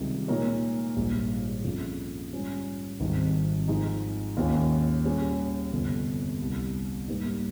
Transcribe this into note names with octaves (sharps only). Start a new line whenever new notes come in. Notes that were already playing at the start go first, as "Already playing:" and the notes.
Already playing: C#2 C3 D#3 G3
A#2 G#3 D#4 A#4 C#5
A#1 G#2 G3
F2 C#3 F3
G#2 G3 C#4 F4
G#1 G#2 D#3 G3 C4
G#2 F3 G#3 D#4
D#2 D#3 G#3 C#4 F4
A#2 G3 C#4 G#4
G1 F2 C3
C2 C3 G3
G#2 G3 A#3 D#4